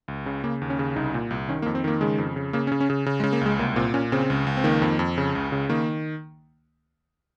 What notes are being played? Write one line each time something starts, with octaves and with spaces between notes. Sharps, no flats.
C#2
C#3
C#3 A#3
D#2
C#4
C#3
C2 D#4
A#2
C2
D#3 C#4
A#3
F2
C4
D#3 A#3
C#3 G#3
F2
C#3
C#3 A#3
C#4
C#3
C#4
C#3
C#3
G#3
C#3
A#3
C#2 G#3
C2 A#3
A#2 C4
A#2 C#4
C#3 C4
C#2
C#2
C4
D#3 A#3
F2
F2
C#3
C#2
C#3
D#3 A#3